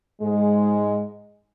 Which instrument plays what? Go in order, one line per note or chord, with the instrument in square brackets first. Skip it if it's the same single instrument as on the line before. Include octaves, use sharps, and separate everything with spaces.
[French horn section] G#2 G#3